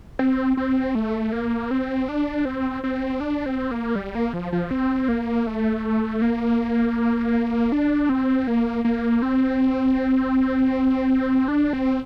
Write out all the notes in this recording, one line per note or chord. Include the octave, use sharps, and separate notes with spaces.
C4
C4
A3
A#3
C4
D4
C4
C4
D4
C4
A#3
G3
A#3
F3
F3
C4
A#3
A3
A#3
D4
C4
A#3
A#3
C4
D4
C4